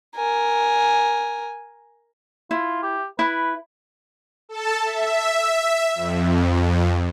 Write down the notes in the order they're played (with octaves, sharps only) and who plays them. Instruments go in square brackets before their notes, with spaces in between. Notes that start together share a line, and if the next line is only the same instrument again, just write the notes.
[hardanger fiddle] A#4 G#5
[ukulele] E4 [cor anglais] F4
[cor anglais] G4
[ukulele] E4 [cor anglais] B4
[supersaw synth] A4 A5
E5
F2